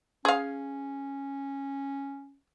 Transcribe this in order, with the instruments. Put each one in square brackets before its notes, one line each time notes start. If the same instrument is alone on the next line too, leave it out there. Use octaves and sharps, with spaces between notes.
[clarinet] C#4 [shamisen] G#4 F5